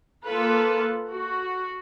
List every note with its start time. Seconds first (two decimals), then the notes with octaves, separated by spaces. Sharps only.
0.24 A#3 F4 A4 B4
1.09 F#4